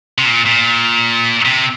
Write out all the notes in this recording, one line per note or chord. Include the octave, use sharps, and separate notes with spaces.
C3
A#2
A#2
C3